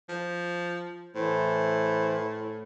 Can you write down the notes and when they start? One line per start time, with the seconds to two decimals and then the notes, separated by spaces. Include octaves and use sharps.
0.09 F3
1.15 A2 E3 C5